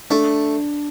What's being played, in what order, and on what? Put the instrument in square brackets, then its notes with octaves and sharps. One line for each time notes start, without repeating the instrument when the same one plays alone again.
[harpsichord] A3 [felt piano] D4